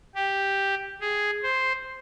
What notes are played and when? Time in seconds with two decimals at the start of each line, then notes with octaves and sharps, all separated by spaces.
0.15 G4
1.01 G#4
1.43 C5